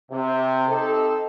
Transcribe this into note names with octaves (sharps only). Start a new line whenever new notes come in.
C3
C4 D#4 G4 A4